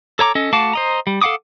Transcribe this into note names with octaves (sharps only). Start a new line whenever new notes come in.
A4 C#5 A#5 D6
C#4 A4 D#5
A3 F#4 F5 A5 D6
C5 D#5 A#5
G3
A4 F5 F#5 D6 D#6